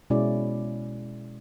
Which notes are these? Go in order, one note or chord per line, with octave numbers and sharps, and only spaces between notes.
B2 G#3 C#4 E4 D5